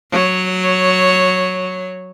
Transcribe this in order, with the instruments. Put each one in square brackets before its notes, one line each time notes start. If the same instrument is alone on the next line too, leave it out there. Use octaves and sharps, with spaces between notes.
[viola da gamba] F#3 C#5